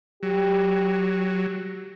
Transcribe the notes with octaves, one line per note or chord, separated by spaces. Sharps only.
F#3 G4